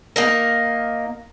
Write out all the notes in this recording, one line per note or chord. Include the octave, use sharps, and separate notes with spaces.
A#3 D#4 A#4